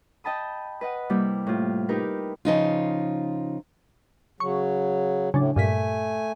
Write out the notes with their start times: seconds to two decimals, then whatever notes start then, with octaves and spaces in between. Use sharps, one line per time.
0.24 D#5 G5 A5 B5 D#6
0.81 B4 D#5 F#5
1.10 C3 G3 A#3 E4 G4
1.47 A2 F4
1.89 D#4 E4 G4 A#4 B4
2.45 C#3 F3 D#4 F4
4.40 C#3 F#3 C#6
5.34 A2 C#3 F#3 D4
5.56 G2 A#2 A3 G#5 B6